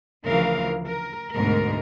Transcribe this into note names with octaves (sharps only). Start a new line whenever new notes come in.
D2 C#3 E3 F3 A#4 F5
A#4
D2 G#2 B2 D3 A3 A#4